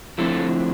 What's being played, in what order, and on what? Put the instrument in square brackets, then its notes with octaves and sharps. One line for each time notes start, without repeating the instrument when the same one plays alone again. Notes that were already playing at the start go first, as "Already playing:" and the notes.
[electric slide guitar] D3 F3 A3 C4 E4 A4